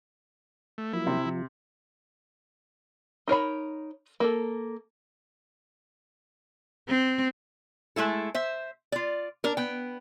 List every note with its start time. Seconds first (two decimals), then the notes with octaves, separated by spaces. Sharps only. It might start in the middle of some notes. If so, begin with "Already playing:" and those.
0.78 A3
0.93 F3 F#3 A#3 E4
1.07 C3
1.26 F3
3.28 D#4 A#4 C#5 B5
4.20 A#3 A4
6.89 C4
7.96 G#3 A3 E4 A4
8.34 C5 E5
8.92 F4 D5
9.44 D4 A#4
9.57 B3 G5